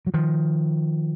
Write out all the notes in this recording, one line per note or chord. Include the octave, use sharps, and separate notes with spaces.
F#3
D#3 F3